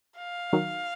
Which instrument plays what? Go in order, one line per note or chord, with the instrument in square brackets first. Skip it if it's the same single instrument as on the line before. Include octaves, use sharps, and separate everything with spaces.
[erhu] F5
[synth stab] D#3 F#3